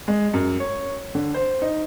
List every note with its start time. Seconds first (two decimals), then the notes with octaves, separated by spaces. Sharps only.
0.08 G#3
0.34 F#2
0.60 C#5
1.15 D3
1.34 C5
1.62 D#4